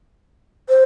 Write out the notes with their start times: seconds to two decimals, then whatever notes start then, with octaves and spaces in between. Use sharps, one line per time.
0.69 C5